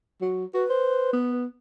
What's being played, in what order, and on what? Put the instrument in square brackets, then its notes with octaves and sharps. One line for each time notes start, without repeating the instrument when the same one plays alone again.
[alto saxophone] F#3
[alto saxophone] F#4 [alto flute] B4
[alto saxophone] C5
B3